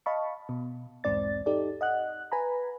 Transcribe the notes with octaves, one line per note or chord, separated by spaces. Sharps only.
D#5 F5 A5 B5 C#6
B2
B1 E2 G#2 C4 D5 A6
D#4 G4 A4 D5
D#5 F#5 F#6
B4 G#5 A#5 B5